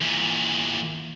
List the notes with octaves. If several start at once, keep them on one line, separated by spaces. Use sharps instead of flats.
E2 A#2